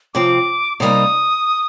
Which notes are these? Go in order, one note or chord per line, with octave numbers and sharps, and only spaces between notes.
C3 F3 C4 D6
C3 G3 A#3 D#4 D#6